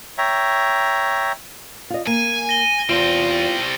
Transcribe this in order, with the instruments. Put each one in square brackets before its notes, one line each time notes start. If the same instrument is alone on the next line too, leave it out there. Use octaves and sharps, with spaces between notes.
[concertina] C#5 E5 G5 A#5
[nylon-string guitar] F4 D#5
[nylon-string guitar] A#3 [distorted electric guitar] G#5 [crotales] D#7
[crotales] A#6 G7
[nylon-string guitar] E2 [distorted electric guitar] G3 C4 [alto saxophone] F4